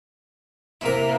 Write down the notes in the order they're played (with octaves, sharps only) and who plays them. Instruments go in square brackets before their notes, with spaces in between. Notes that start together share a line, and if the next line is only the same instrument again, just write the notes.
[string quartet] C3 A#3 [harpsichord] E4 A#4